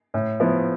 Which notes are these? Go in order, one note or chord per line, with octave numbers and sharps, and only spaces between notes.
A2
F3 B3 E4